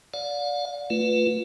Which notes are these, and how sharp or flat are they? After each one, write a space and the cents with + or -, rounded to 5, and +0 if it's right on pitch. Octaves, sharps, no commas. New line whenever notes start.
D5 -15 F5 +45
A3 +20 F4 +0 B4 +0